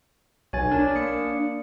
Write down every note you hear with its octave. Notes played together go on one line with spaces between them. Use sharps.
B1 C#5 G#5 A6
D4 A#4
A#3 C#7